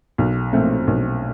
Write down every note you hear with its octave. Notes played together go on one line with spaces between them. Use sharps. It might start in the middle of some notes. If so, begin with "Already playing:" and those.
B1
A#2 F3 A3 C4
B1